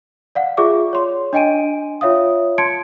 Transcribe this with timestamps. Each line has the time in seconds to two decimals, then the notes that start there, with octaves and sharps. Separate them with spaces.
0.35 D5 F5 F#5
0.57 F4 G#4 D5 E5 C#6 D6
0.93 C#5 C6
1.33 D4 D#5 G5 G#5 D7 D#7
2.01 F4 C#5 E5 F5 D#6
2.58 A5 C6 G#6 C#7 D7